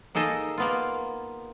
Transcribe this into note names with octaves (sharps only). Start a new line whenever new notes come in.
A#3 D#4 G#4 A4 D#5
A#3 B3 F4